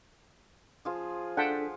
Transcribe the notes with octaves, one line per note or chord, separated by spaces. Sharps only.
F3 F4 G#4
D4 F4 A4 F#5 G5 A5 B6